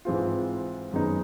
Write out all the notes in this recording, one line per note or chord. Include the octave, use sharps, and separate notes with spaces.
G#2 E3 G#3 C4 F4
F#2 D#3 G#3 B3 D#4